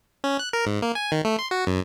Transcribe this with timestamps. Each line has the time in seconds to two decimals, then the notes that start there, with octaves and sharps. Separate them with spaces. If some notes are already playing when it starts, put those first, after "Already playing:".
0.24 C#4
0.39 F#6
0.53 A#4
0.66 G#2
0.82 A#3
0.95 G#5
1.12 D#3
1.25 A3
1.39 C6
1.51 F#4
1.67 F#2